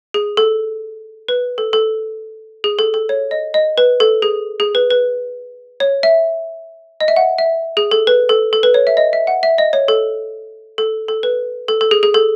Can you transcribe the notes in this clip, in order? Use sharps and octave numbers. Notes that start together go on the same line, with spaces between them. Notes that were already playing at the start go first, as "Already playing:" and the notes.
G#4
A4
B4
A4
A4
G#4
A4
A4
C#5
D#5
D#5
B4
A4
G#4
G#4
B4
B4
C#5
E5
D#5
E5
F#5
E5
G#4
A4
B4
A4
A4
B4
C#5
E5
D#5
E5
F#5
E5
D#5
C#5
A4
A4
A4
B4
A4
A4
G#4
G#4
A4